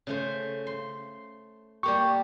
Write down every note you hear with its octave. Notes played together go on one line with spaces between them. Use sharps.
C#3 A3 C5
C6
G3 A#3 G4 C#6